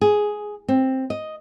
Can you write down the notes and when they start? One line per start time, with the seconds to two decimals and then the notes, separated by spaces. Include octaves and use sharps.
0.01 G#4
0.68 C4
1.10 D#5